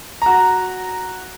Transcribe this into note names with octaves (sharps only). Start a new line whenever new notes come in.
F#4 A#5